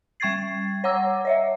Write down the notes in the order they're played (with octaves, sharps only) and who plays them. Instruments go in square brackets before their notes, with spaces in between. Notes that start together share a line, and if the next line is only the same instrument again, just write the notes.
[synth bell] G3 G5 C#6 G#6 A6 C7
C#5 F#5 A#5 D6 E6
C#5 D#5 E5